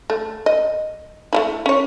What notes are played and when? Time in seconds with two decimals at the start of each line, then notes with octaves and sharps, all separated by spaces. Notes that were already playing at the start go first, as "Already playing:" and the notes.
0.10 A3
0.46 D#5
1.33 A3 C#4 E4
1.66 C#4 C#5